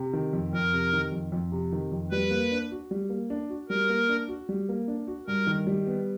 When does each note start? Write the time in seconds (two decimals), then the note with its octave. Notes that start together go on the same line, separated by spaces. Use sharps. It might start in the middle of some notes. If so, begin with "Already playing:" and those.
Already playing: C3
0.13 D#3
0.33 F2
0.53 F2 A#4
0.73 C3
0.93 D#3
1.12 F2
1.32 F2
1.52 C3
1.72 D#3
1.92 F2
2.11 G3 B4
2.31 A#3
2.52 D4
2.71 F#4
2.91 G3
3.10 A#3
3.30 D4
3.50 F#4
3.69 G3 A#4
3.89 A#3
4.09 D4
4.28 F#4
4.49 G3
4.69 A#3
4.88 D4
5.07 F#4
5.27 G2 A#4
5.47 D#3
5.67 G3
5.87 B3